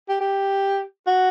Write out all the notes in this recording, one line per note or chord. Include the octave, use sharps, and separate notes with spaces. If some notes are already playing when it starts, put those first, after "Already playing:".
G4
G4
F#4